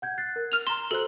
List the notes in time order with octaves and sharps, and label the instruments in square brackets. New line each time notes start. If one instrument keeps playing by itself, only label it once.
[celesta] F#5 G6 G#6
F#6 A6 C7
A#4
[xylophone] F6 F7
[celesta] A#5 E7 [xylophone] C6
[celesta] F#4 C5 [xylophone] A4 F#6